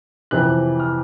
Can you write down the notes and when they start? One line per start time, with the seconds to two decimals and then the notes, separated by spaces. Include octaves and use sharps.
0.31 F2 C3 E3 F#6
0.80 F6